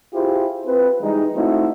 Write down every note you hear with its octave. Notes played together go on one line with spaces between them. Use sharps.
E4 F4 G4 G#4 C5
C4 F4 B4
E3 G3 G#3 D#4
A3 C4 D#4 E4 F#4